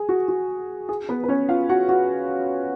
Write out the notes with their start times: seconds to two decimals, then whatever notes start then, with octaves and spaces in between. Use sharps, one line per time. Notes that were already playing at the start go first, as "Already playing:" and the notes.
Already playing: G#4
0.09 F#4
0.28 F#4
0.89 G#4
1.09 B3 B4
1.24 B4
1.28 C#4 C#5
1.49 F4 F5
1.69 F#4 F#5
1.89 F#4 F#5